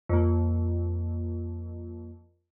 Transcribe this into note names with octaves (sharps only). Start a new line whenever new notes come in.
F2 A#3